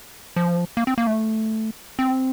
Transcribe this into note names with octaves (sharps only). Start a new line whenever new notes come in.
F3
A#3
C4
A#3
A3
C4